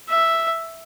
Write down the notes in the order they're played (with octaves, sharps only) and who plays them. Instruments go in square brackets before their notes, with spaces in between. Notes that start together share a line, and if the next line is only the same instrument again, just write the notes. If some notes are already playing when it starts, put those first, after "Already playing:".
[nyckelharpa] E5